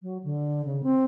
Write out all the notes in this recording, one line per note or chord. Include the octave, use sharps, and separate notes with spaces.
F#3
D3
C#3
C4